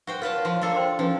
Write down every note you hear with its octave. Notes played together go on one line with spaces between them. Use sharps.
F#4 C5 G5
F4 A#4 B4 C#5 A5
F3 C#5 C6
A#3 D4 A4
C5 G5 C6
F3 C#4 D4 B4